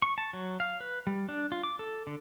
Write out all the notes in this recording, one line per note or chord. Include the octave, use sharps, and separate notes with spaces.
C#6
A5
F#3
F5
B4
G3
D4
F4
D6
A4
D3